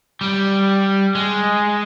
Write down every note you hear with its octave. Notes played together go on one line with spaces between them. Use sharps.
G3
G#3